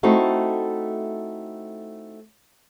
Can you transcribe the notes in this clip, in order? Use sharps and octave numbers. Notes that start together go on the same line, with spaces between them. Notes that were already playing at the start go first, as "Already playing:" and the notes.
A3 C4 D#4 E4 F#4 A4